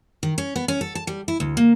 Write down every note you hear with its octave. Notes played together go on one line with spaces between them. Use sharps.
D#3
C#4
B3
C#4
A4
A5
G3
E4
D2
A#3